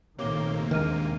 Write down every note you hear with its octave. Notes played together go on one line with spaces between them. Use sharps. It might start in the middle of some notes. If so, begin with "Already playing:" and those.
A#1 C3 D#3 A3 A#3 C#5 D6 G7
D#2 D#3 G#3 D4 F6 D#7